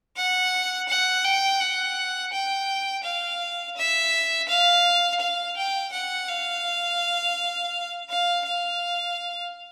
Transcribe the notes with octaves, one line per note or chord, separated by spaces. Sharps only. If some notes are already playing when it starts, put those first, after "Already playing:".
F#5
F#5
G5
F#5
G5
F5
E5
F5
F5
G5
F#5
F5
F5
F5